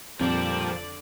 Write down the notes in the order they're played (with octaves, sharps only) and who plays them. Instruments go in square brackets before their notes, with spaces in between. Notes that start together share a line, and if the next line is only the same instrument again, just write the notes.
[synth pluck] F2 [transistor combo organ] A#2 G3 [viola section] D3 D5 [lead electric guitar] F3